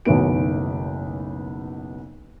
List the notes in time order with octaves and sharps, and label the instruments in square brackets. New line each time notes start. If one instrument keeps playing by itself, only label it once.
[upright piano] F#1 B1 D#3 A3 B3 D7